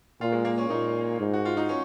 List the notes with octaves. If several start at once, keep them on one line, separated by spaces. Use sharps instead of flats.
A#2 F4
G#3
A#3
C#4
A#2 D#4
G#2
F#4
F4
D#4
C#4